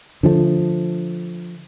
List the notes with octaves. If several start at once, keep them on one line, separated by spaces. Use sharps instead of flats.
D3 F3 G3 A3